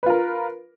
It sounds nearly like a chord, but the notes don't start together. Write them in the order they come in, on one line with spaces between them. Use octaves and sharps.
B4 F4 A#4